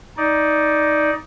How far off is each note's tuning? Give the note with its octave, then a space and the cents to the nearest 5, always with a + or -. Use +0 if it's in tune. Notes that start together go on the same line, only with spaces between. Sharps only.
D#4 +10 D5 +0